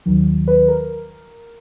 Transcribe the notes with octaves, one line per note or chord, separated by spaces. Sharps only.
D#2 D#3 F#3
B4
A#4